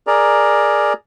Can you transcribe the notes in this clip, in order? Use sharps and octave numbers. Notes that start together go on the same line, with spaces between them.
G#4 A#4 D5 A#5